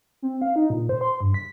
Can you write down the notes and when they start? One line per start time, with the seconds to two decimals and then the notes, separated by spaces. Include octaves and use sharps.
0.22 C4
0.42 F5
0.56 D#4
0.70 A#2
0.89 C5
1.01 C6
1.21 G2
1.34 B6